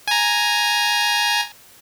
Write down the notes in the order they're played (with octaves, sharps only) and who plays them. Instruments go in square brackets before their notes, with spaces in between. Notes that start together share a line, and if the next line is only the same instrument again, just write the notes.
[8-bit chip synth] G#5 A#5